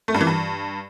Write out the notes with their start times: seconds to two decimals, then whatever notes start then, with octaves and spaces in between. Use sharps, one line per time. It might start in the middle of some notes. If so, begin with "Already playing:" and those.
0.08 A3
0.14 G2
0.21 E3
0.27 G2